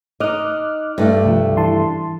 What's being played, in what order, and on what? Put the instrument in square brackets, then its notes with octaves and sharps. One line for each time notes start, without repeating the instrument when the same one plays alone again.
[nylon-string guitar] D#4 D#5 [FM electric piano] D6 F6 F#6
[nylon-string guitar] G2 A3 D5
[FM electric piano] C2 F3
E3 A5 C6